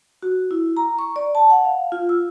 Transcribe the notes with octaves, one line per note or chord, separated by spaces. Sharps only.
F#4
E4
A#5
C#6
D5
A5
F#5
F5
F4
E6